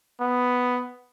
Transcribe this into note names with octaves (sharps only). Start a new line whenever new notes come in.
B3